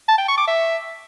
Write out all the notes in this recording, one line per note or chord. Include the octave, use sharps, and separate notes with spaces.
A5
G5
C#6
D6
E5